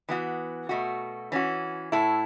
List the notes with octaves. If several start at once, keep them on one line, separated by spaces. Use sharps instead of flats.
E3 B3 F#4
B2 A3 F#4
E3 C#4 F#4
A2 A3 E4